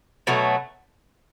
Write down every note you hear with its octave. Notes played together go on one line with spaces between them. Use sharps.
B2 F#3 A3